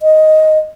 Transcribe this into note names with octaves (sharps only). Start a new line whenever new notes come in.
D#5